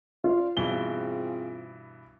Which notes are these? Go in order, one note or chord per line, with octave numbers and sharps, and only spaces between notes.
F4 C5 D5 F5
G2 B2 E3 C4 F4 G#4 G7